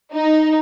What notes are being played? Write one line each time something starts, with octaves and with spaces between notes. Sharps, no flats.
D#4